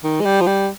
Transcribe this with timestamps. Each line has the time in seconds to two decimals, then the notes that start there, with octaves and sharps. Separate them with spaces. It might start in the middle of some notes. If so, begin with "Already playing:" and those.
0.04 D#3
0.21 G#3
0.25 G3
0.41 F3
0.47 G3